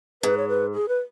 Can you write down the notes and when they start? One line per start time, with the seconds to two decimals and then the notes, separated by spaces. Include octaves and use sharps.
0.23 G#2 B4
0.38 C#5
0.49 B4
0.73 G#4
0.88 B4